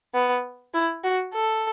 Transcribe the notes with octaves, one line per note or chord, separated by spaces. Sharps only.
B3
E4
F#4
A4